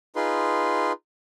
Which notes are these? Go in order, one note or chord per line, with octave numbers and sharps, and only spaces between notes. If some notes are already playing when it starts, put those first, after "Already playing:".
D#4 F4 G#4 B4 C6